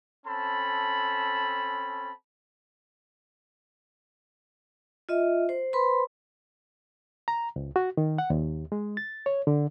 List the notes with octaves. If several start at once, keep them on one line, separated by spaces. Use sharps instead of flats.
C4 C#4 A4 A5 B5
F4 D#5 E5
C5
B4 C5 B5 C6
A#5
C#2
F#4
D#3
F#5
D#2
G#3
A6
C#5
D3